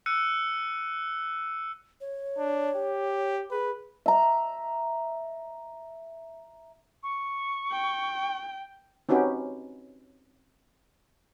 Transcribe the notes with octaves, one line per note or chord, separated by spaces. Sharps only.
E6 F#6 C#7 D#7
C#5
D4
G4
G#4 B4
E5 A#5
C#6
G5
C4 C#4 D#4 F#4 G4 B4